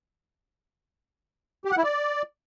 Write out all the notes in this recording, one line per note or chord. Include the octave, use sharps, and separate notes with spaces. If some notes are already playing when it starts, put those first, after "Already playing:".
G4
F#5
E4
D5